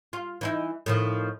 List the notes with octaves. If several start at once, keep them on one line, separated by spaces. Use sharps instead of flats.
F4
E3 D#4 E4
A2 D#3 F3